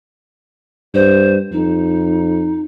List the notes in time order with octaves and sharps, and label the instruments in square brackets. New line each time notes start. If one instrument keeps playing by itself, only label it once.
[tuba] G2 [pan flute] C5
[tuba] F2 [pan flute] D#4